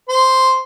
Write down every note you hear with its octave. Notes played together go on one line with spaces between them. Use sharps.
C5